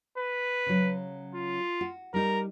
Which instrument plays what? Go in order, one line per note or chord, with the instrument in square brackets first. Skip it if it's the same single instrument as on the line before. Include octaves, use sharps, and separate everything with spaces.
[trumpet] B4
[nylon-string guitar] C#3 F#3
[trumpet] F4
[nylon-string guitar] F#4
[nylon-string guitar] G3 D#4 [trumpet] A#4